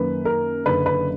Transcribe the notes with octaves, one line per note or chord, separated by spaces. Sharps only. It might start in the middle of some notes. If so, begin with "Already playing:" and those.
Already playing: F#2 D#3 A#3 B4
A#4
F#1 F#2 D3 B4
B4